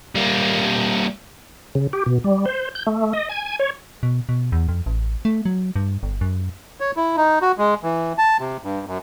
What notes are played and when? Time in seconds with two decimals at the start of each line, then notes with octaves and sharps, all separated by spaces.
0.15 G3 A#3
1.75 C#3
1.93 G4
2.06 B2
2.24 G3
2.46 C5
2.75 G6
2.87 A3
3.13 D#5
3.29 G#5
3.59 C#5
4.03 B2
4.29 B2
4.52 E2
4.69 F2
4.86 A1
5.25 A3
5.45 F#3
5.76 G2
6.03 G1
6.21 F#2
6.80 C#5
6.96 E4
7.17 D#4
7.42 F#4
7.58 G#3
7.83 E3
8.18 A5
8.40 C3
8.64 G2
8.87 F#2